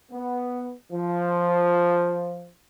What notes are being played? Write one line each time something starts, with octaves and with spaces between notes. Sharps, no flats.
B3
F3